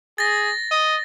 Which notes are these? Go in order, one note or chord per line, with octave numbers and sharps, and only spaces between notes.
G#4 A6 A#6
D#5